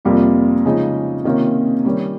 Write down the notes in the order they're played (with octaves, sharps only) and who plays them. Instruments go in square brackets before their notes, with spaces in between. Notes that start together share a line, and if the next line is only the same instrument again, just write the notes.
[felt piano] F2 C3 G3 A#3 F4
C#3 F3 G#3 D#4
C3 D#3 A#3 C#4 F4
D#3 G3 C#4